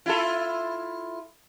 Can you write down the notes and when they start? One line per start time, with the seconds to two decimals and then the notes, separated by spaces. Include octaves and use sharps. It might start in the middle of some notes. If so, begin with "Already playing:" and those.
0.06 E4 F4 A4